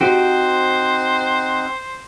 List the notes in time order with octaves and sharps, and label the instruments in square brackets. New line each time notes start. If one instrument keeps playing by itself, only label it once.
[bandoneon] C4 D#4 F#5 [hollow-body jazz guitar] F#4 G4 [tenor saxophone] C5